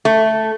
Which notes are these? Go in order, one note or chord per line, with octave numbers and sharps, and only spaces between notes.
A3